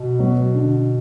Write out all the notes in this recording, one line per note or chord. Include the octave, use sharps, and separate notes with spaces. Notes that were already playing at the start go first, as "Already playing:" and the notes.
Already playing: B2
F#3 B3 F#4
D3